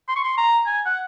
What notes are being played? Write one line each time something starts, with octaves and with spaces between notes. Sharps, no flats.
C6
C#6
C6
A#5
G#5
F#5